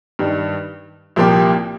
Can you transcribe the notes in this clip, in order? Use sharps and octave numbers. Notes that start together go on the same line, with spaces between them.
G2 D#3 G3
C2 A#2 F3 A#3 G4